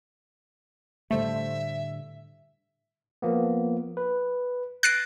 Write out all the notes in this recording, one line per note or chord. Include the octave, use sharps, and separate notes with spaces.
A2 D3 G3 A3 C5 E5
F3 A#3 B3
B4
F#6 A6 A#6 C7 D7